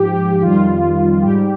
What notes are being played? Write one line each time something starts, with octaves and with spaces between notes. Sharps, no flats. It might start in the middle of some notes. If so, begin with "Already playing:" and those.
Already playing: G#2 F3 G4
G4
F2 D#3 G3 F4
G#2 G3 G4